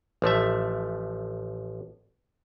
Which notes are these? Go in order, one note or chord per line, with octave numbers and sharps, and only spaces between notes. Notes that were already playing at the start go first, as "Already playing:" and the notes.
A1 F3 A3 E5